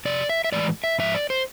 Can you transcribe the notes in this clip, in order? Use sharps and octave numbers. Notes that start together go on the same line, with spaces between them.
F2 C3 D5
E5
E5
A2 E3 G#3 D5
E5
G#2 F3 E5
D5
C5